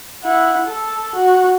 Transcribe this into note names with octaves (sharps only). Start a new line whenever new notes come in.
E4 F#5
A4
F#4